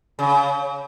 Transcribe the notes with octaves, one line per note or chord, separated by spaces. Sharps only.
C#3